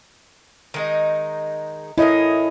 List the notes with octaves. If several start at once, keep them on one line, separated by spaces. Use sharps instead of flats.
D#3 G#3 D#4
A2 C#4 E4 A#4 D#5